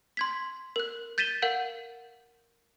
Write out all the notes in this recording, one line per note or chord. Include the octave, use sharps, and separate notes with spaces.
C6 G#6 B6
A#4 F#6
G6 A6 B6 D#7 E7 G7
A#4 F5 F#5 G6